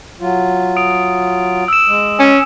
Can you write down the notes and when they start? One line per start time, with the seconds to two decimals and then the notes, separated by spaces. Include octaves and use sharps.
0.20 F#3 F4
0.77 D#6 D7
1.68 E6 E7
1.87 G#3
2.20 C#4